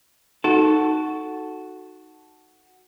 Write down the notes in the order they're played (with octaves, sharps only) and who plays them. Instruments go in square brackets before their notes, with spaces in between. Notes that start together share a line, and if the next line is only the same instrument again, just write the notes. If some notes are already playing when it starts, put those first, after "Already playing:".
[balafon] D#4 [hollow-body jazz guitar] F#4 A4